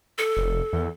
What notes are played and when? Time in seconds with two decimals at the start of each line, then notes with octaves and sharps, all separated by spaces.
0.18 A4
0.37 F1
0.73 E2